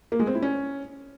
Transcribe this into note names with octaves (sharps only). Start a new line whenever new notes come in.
A#3
G#3
C4
E4
C#4